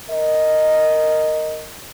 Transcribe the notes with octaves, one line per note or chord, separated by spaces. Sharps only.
A#4 D#5